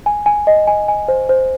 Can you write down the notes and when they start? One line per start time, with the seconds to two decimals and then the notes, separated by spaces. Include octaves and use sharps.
0.06 G#5
0.26 G#5
0.47 D#5
0.67 G#5
0.88 G#5
1.08 C5
1.29 C5